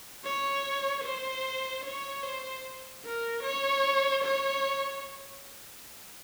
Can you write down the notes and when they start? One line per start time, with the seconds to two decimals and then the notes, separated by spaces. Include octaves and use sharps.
0.25 C#5
1.04 C5
1.84 C#5
2.23 C5
3.04 A#4
3.43 C#5
4.24 C#5